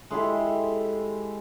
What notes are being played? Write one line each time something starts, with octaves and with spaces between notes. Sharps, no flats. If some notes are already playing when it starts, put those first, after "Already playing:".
G#3 E4 G4 A4